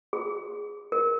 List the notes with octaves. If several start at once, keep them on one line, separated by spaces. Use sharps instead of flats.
G#4
A#4